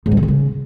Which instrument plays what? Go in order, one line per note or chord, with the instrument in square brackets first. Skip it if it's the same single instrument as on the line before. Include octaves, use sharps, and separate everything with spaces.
[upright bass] G#2
G3
D3
D#3
C#3